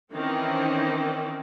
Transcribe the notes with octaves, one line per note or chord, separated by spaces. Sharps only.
D#3 E3 C4 C#4